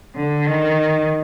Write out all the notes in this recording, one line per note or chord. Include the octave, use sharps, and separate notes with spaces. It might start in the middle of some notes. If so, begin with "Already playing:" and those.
D3
D#3